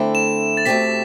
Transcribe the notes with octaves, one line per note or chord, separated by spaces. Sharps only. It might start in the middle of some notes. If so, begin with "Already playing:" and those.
Already playing: D3 A3 C4 E4
E7
A6
B2 A3 C4 G4 B6